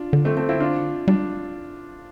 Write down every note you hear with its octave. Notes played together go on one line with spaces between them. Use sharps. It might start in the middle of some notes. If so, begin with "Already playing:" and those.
Already playing: D4 F4
D3
A3 C4
A3 C4
C4 E4
D4 F4
G3 D4